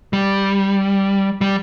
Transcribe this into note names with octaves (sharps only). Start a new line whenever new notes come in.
G3
G3